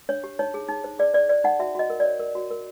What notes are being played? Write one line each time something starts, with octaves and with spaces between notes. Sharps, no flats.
D4 C#5
G4
D#4 C#5
G#4
D#4
C5
G#4 D5
C5 D5
C5 D5
D#4 F#5
F#4 E5
F#4 D#5
A#4
C#5 D5
A#4
F#4
A#4